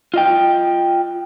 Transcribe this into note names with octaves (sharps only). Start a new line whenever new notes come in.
F4 D#5 G5